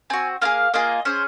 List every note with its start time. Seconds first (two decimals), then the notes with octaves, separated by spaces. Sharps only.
0.10 C4 F#4 G#5
0.41 A#3 F4 G#4 F5
0.74 A#3 F4 G#4 D#5
1.05 C#4 G#4 C5